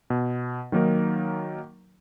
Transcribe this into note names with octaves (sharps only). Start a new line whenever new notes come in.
B2
D#3 F#3 A#3 D#4 A#4